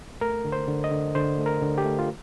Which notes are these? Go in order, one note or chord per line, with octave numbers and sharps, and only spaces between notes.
A3 A#4
D3
C5
D3
D#5
D3
D3 C5
A3
A#4
D3
G4
A3
F4